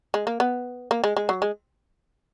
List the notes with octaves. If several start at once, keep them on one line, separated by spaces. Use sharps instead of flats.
G#3
A#3
B3
A#3
G#3
G#3
F#3
G#3